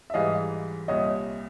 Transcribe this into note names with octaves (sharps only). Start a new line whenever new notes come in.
E5
G#2 E3 G3 D#5 F5
C2 A#2 G3 C#5 D#5